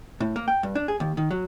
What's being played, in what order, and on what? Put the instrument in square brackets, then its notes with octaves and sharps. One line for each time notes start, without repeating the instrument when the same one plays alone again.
[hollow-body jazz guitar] A2
A#3
G5
G2
D4
G#4
D#2
D#3
F#3